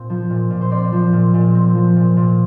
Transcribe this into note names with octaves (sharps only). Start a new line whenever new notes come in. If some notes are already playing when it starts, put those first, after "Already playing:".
Already playing: A#2 C4
F3
A#2
A#2
C5
C4 D5
F3
A#2
A#2
C4
F3
A#2
A#2